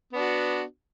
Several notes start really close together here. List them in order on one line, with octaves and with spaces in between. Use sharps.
B3 D4 F#4